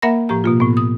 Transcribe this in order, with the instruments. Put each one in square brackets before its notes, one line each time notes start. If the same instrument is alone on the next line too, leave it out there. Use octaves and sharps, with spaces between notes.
[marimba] A#3 A#4 E5 F#5 B5 A#6
A2 F3 G4 A#5
B2 A#3 F4
A2 B3
D#6